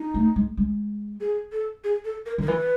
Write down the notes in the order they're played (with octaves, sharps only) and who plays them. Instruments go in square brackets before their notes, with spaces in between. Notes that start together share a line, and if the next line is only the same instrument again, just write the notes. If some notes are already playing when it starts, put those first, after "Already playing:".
Already playing: [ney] D#4
[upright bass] A3
G#3
G#3
[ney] G#4
A4
G#4
A4
A#4
[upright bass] D#3 [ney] A#4
[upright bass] E3 [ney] B4